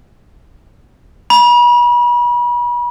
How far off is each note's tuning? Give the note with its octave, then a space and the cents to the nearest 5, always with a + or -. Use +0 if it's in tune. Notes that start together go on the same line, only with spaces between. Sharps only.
B5 -40